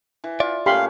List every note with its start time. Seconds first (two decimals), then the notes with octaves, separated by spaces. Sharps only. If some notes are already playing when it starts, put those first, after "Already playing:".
0.24 E3
0.40 F4 D5 E5
0.66 A#2 A3 C#4 G4 F5 B5 C6